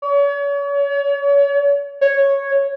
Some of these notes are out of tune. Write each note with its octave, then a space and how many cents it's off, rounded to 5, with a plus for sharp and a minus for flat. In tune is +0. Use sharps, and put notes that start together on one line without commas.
C#5 +40
C#5 -5